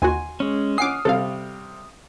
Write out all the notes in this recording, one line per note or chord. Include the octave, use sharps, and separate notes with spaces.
D#2 F#4 G#5 C6
G#3 C#4
C#4 F#5 G#5 D6 D#6 F6 C7
C3 G3 C4 A4 F5